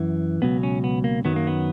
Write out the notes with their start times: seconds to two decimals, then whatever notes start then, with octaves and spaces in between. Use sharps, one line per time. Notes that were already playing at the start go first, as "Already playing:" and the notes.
Already playing: F#2 E3
0.42 C#2 B2 F#3 B3
0.63 C#4
0.84 B3
1.04 A#3
1.25 F#2 D#3 F#3 B3
1.36 A#3
1.47 B3